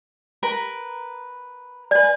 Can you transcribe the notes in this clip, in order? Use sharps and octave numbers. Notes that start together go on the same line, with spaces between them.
A#4 B4 B5
B4 D5 G#5